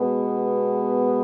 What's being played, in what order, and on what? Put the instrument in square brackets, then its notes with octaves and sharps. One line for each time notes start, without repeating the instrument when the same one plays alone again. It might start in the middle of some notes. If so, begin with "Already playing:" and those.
Already playing: [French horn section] B2 G#3 B3